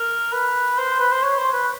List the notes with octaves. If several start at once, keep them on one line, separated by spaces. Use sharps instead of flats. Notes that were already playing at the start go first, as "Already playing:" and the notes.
Already playing: A#4
B4
C5
B4
C5
C#5
C5
B4